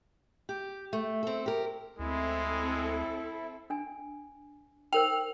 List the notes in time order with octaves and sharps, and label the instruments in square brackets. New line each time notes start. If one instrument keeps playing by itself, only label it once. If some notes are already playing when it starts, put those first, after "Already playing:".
[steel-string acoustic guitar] G4
A3
C4 A4
G4 A#4
[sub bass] D2 [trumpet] G#3 [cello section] C4 A4 [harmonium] E4
[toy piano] D4 G#5
[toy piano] D#4 A#4 C5 [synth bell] G5 F7